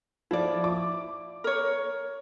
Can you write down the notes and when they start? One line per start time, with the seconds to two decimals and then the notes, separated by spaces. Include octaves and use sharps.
0.31 F3 E4 D5
0.64 D6
1.44 A#4 C#5